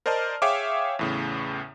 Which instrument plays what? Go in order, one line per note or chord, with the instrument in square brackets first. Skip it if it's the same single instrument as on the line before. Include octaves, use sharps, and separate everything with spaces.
[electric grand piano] A#4 C5 D5 D#5 A5 F6
G#4 C#5 E5 F5 G5 D6
E2 A2 C#3